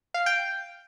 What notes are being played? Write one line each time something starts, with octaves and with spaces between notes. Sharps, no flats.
F5
G5